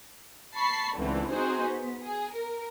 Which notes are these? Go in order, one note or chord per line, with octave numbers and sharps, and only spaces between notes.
A5 B5 C#6 C7
C#2 D3 E3 A3 C4
C4 D#4 F#4 G#4 C5
B3
G#4
A#4